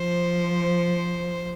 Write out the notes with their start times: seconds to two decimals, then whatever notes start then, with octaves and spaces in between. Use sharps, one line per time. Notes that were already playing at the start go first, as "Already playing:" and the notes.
Already playing: F3 C5